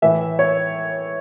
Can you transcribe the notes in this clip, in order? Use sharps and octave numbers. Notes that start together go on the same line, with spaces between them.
A2 E3 E5
C#5